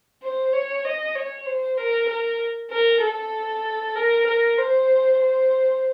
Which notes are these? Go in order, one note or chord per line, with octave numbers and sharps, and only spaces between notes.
C5
C#5
D#5
C#5
C5
A#4
A#4
A#4
A4
A#4
A#4
C5
C5